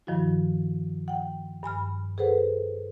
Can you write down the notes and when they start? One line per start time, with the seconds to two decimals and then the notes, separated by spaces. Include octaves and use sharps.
0.07 G2 D#3 F3 E4 F#4
1.08 F#5 G5
1.63 G2 G#5 B5 F6
2.18 G#4 A4 B4 C5 F#5